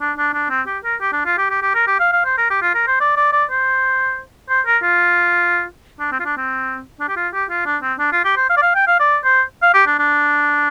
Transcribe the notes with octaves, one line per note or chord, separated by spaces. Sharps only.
D4
D4
D4
C4
G4
A#4
G4
D4
F4
G4
G4
G4
A#4
G4
F5
F5
C5
A#4
G4
F4
A#4
C5
D5
D5
D5
C5
C5
A#4
F4
D4
C4
F4
D4
C4
D4
G4
F4
G4
F4
D4
C4
D4
F4
G4
C5
F5
D5
F5
G5
F5
D5
C5
F5
G4
D4
D4